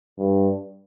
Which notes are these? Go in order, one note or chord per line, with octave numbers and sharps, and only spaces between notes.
G2